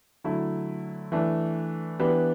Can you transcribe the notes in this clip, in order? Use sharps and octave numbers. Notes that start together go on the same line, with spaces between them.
D3 F#3 A3 E4
E3 A3 D4
E3 B3 D4 G4 B4